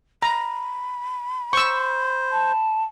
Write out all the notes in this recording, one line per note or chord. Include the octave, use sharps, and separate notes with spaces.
A#5 B5
C5 C#6 E6
A5